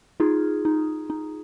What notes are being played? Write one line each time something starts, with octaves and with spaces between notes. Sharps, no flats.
D#4 F4 G#4
D#4
D#4